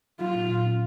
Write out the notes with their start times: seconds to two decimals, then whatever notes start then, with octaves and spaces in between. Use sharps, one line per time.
0.20 F#3 F4
0.35 A#2
0.50 A#2
0.66 C#4